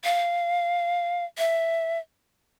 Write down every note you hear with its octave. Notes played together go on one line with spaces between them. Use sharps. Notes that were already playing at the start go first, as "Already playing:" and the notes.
F5
E5